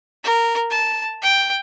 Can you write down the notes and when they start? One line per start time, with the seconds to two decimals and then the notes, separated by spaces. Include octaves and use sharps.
0.24 A#4
0.70 A5
1.22 G5